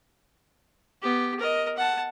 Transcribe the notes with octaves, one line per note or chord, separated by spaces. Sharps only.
B3 G4
A#4 D#5
F#5 A5